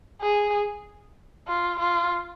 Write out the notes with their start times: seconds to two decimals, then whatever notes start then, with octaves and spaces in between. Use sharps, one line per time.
0.21 G#4
1.48 F4
1.80 F4